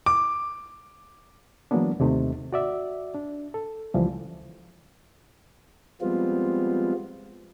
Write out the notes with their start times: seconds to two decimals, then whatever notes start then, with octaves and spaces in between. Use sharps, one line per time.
0.06 D6
1.71 E3 F#3 G#3 A#3 B3 D4
2.00 D#2 C3 A3 D#4
2.53 F#4 D5 E5
3.14 D4
3.54 A4
3.94 C#2 E3 F3 G3
6.01 F3 G3 G#3 B3 C4 F4